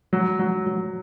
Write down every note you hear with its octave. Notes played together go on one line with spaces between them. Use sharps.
F#3
F#3
F#3